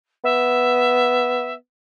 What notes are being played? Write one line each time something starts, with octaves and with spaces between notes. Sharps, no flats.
B3 E5